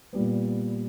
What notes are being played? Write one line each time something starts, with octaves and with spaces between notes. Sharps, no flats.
A#2 G3 B3